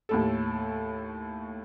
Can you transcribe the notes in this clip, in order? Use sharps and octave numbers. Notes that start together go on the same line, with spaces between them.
D#2 A2 A4